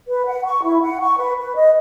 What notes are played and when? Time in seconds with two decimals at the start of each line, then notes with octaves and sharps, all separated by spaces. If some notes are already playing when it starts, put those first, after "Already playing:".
0.07 B4
0.26 F#5
0.45 C#6
0.63 E4
0.82 F#5
1.00 C#6
1.19 B4
1.38 B4
1.55 D#5